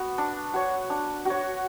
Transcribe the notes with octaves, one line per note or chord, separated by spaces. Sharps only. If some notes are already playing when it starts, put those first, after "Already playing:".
Already playing: B3 F#4
D4
F#4 C#5
D4
F#4 C#5